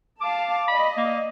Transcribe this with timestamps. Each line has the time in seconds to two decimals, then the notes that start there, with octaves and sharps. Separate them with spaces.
0.21 F5 A5 D6
0.68 D5 D#5 B5
0.97 A#3